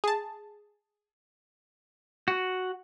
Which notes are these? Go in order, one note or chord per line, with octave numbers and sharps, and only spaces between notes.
G#4 A5
F#4